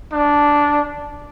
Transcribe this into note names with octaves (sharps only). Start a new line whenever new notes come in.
D4